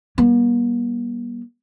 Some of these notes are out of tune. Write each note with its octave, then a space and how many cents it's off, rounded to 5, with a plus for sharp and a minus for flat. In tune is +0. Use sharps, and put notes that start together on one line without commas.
G3 -10 A#3 +45